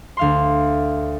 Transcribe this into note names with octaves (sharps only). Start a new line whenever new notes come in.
D2 F5 C6